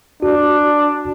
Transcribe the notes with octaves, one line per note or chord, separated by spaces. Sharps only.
D4 F#4